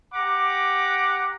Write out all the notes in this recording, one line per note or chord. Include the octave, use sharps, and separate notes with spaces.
G4 F#5 A#5 D6